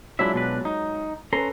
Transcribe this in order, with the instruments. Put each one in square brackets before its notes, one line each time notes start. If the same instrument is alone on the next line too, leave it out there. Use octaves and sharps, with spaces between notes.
[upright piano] F#3 G#3 F4 [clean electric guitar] D4 E4 E5
[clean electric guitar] B2 D4 B4
D#4
[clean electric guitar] C#4 A#5 C6 [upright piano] A4 B4